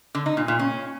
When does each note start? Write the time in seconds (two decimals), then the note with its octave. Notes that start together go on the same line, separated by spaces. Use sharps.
0.15 D3
0.26 D#4
0.37 A#2
0.48 A#2
0.59 C#4